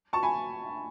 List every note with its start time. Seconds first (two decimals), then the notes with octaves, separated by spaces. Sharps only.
0.13 A5 C#6
0.23 G#5 B5